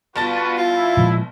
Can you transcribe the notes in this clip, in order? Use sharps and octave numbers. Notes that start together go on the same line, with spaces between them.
G1 F4 F#4 B4 A5 A6
E4 F4
A#2 F3 G#3